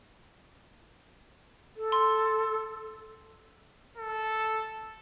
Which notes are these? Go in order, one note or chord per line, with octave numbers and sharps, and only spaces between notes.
A4
C6
A4